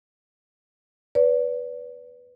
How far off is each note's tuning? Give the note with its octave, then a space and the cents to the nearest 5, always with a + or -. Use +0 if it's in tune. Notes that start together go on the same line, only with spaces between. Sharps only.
B4 +0 D5 -30